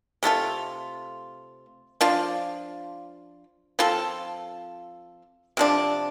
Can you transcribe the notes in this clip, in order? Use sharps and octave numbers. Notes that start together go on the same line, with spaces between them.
C3 A3 F4 A4
F3 D4 F4
F3 C4 F4 A4
C3 F3 D4